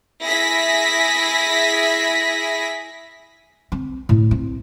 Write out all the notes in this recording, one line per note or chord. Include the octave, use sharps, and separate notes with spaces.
E4 G#4 A#6 B6
C4
A2
C4